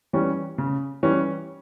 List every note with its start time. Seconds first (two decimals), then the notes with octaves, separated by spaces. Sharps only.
0.13 E3 G3 C#4
0.58 C#3
1.03 E3 G3 C#4